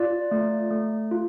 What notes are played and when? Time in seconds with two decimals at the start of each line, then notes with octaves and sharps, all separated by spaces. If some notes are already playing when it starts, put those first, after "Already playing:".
Already playing: F4 D5
0.31 A3
0.71 A3
1.11 F4